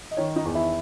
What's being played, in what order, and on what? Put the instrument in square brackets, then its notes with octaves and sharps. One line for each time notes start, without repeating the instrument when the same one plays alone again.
[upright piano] D#5
D#3 C#5
D#4 D#5
E2
E4 E5